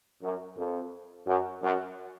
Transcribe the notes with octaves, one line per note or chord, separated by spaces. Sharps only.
F#2
F2
F#2
F#2